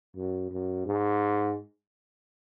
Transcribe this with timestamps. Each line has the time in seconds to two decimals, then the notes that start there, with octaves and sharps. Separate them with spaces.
0.17 F#2
0.51 F#2
0.86 G#2